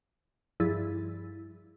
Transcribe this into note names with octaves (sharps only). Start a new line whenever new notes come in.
G2 F3 E4 G#4 A6